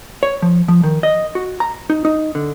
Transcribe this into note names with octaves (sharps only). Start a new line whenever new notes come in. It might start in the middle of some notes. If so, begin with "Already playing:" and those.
C#5
F3
F3
D#3
D#5
F#4
A#5
D#4
D#4
D3